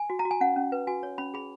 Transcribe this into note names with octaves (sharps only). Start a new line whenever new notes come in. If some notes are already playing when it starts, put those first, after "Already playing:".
Already playing: G#5
F#4
A#5
F#4
G#5
C#4 F#5
C#4
B4
F#4 G#5
C#5
C#4 B5
G#4 B5